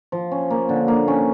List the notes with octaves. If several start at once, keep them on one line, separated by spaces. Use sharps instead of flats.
F3
C#4
A#3
D3
A#3
C#4